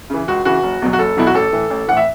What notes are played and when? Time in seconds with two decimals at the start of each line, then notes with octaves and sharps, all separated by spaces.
0.10 C#3 E3
0.28 C#2 F#4
0.45 C#3 E3 F#4
0.63 F#1
0.82 E2 B2 F#3
0.93 F#4
0.99 F#1 A4
1.17 E2 B2 F#3 E4
1.27 F#4
1.34 A1 A4
1.52 A2 E3
1.70 A1
1.88 A2 E3 F#5
1.97 E5